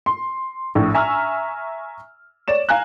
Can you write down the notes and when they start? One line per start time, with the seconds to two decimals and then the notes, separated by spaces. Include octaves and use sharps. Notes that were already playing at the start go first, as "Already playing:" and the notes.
0.06 C6
0.75 A#1 A2
0.94 E5 G#5 A#5 C#6 E6 F6
2.48 C#5 D5 E7
2.69 F5 G#5 A#5 F#6